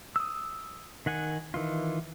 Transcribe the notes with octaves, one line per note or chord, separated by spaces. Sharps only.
D#6 E6
D#3 F#5 G#5
D#3 E3 F4